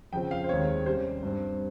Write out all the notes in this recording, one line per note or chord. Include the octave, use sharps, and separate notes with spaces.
F2 C#3 F3 C4 G5
F5
C5
D#2 D#3 G#3 C4 C#5
C3 G3 C#4 C5
G2 G3 C4